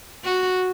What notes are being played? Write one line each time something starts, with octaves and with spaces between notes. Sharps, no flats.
F#4